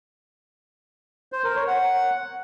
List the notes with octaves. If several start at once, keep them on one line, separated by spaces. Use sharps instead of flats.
C5
A#4
C#5
F#5